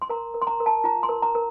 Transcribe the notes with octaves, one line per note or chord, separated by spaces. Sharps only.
C6
A#4 A#5
A#4
C6
A#5
A#4
A5
F4 A#5
C6
A#4
A#5
A#4